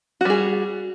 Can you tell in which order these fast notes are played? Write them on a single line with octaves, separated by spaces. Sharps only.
F#4 G3 G#4